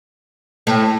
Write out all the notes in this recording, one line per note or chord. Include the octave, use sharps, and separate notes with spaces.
A2